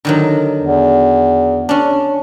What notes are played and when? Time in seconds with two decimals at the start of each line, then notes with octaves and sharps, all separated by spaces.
0.05 D3 D#3 F#3
0.60 E2
1.69 C#4 D4